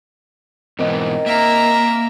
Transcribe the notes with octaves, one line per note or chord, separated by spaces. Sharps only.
G#2 B2 D#3 E3 C4 D#5
A#3 E5 A#5